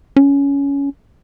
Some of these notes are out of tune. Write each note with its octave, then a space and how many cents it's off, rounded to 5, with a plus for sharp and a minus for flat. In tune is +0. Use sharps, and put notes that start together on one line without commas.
C#4 +15